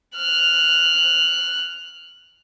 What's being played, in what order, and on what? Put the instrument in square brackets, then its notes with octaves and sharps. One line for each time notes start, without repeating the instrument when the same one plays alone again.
[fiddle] F6 F#6